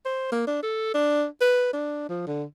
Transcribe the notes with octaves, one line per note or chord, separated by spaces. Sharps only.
C5
A#3
D4
A4
D4
B4
D4
F3
D3